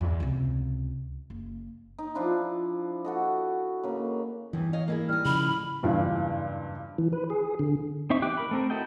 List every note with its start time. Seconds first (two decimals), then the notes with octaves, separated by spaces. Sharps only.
0.01 E2
0.20 C#2 C3
1.30 F#1
1.98 D#4
2.15 F3 D4 E4
3.05 F#4 A4 D#5
3.83 C#3 A#3
4.53 E2 G2 E3
4.73 C#5 D#5 F5
4.88 A#3 E4 G#4
5.09 G3 D#4 F6
5.25 C#3 F3 B5
5.42 A2
5.83 F#1 E2 G2 G3 E4 F4
6.98 E3
7.13 B4
7.30 G#4
7.59 D3
8.10 C4 D#4 E5 C#6
8.22 E3 G4 G5 D6 F#6
8.37 A#4 B5
8.51 A3 C4 A#4
8.70 E4 F#4 A4 D#5 G5